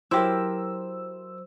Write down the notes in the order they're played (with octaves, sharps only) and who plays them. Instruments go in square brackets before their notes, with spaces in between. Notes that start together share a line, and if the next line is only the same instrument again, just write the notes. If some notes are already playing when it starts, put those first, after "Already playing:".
[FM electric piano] F#3 C5 E6 [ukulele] E4 G4 A#4